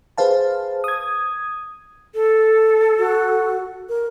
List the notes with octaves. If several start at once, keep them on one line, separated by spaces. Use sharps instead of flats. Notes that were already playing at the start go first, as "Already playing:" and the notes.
G#4 B4 C5 F5 A5
D#6 G#6
A4
F#4
A#4